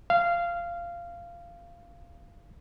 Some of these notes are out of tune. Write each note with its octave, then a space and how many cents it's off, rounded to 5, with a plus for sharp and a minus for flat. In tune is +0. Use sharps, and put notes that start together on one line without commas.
F5 -15